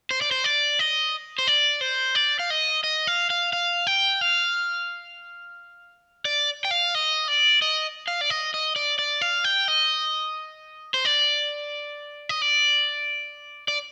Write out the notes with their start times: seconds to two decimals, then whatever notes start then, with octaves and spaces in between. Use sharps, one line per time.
0.11 C5
0.21 D5
0.31 C5
0.44 D5
0.79 D#5
1.38 C5
1.47 D5
1.81 C5
2.15 D5
2.39 F5
2.50 D#5
2.84 D#5
3.07 F5
3.30 F5
3.53 F5
3.87 G5
4.21 F5
6.25 D5
6.65 G5
6.71 F5
6.95 D#5
7.28 D5
7.62 D#5
8.08 F5
8.21 D5
8.30 D#5
8.54 D#5
8.76 D5
8.99 D5
9.21 F5
9.44 G5
9.68 D#5
10.94 C5
11.05 D5
12.29 D#5
12.42 D5
13.68 D5